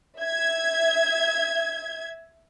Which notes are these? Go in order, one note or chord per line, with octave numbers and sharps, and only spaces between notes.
E5 G#6